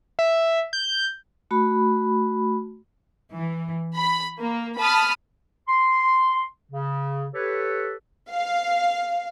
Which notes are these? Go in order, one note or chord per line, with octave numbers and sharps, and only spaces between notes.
E5
G6
A3 F#4 B5
E3
B5
A#3
A5 B5 D#6 F6
C6
C#3
G4 A4 B4 C#5
F5